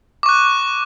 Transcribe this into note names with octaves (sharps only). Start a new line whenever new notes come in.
C#6 D6 F#6